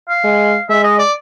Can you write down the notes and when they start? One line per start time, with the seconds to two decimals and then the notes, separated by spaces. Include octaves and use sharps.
0.09 F5
0.24 G#3
0.69 G#3 E5
0.84 D#5
0.99 D5